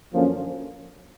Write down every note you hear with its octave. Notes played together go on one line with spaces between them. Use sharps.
F#2 D3 F3 A#3 C#4